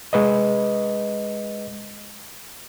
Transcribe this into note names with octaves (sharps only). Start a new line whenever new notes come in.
G#3 B4 D#5